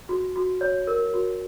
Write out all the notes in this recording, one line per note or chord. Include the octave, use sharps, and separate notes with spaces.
F#4
F#4
C#5
A#4
F#4